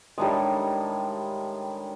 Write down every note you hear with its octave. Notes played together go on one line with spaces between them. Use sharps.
A2 D#3 G3 G#3 D4 D#6